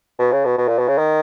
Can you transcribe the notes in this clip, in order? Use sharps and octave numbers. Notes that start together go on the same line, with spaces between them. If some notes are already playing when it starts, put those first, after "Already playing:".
B2
C#3
B2
B2
A#2
B2
C#3
D#3